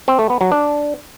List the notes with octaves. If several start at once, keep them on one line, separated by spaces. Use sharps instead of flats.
C4
A3
B3
F#3
D4